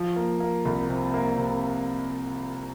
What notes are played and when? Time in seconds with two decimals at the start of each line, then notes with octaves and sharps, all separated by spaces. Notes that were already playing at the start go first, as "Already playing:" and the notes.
Already playing: F3
0.16 A#3
0.40 A#3
0.65 C2
0.89 C3
1.14 A#3
1.38 C3